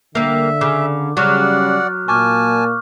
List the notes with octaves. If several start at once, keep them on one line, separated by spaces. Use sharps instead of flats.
D3 G3 A#3 E5
C#3 D6
C#3 F#3 G3 D5 F#5 F6 F#6
A#2 A#3 G#5 A5 C#6 D6 F6